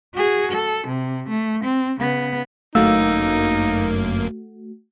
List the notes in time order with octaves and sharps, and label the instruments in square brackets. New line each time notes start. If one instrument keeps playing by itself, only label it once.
[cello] F#4 G#4
A4
C3
A3
C4
C#3 B3
[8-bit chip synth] G1 F#2 A#3 [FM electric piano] A3 F#4 [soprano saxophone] D#4 [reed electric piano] F5 E6